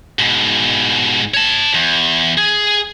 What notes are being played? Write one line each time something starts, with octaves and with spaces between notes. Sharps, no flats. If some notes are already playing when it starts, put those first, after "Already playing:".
G#2 B2
C#5 A5
E2
G#4